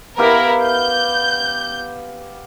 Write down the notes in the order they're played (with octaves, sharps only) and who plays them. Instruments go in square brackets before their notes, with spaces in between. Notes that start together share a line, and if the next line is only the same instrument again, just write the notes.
[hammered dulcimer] B3 G4 F5 [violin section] E4 A#4
[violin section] G6